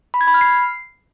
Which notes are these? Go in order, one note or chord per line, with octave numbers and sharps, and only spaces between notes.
B5
G#6
B5
F6
C7